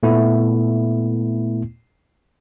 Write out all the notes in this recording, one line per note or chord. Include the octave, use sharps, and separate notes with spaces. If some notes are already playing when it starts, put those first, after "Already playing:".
A#2 A3 B3 E4